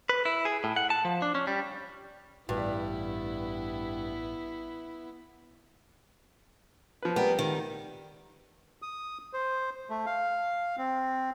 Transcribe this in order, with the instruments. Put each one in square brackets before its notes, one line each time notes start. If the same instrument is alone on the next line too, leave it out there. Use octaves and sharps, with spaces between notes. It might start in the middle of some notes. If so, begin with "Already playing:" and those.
[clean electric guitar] B4
E4
G#4
A2
F#5
A5
F3
D4
C#4
G3
[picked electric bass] A1 [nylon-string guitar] G2 [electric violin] B3 E4
[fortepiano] F3 B4
[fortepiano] G3 A#4 G5 [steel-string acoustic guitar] B3
[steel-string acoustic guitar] D#3
[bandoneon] D#6
C5
A3
F5
C4